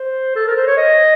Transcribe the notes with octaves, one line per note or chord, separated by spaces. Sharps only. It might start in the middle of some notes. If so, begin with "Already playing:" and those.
Already playing: C5
A4
A#4
C5
C#5
D#5